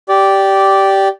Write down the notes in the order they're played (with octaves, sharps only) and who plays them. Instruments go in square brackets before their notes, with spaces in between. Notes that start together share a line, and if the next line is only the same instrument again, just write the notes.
[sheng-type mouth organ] G4 D5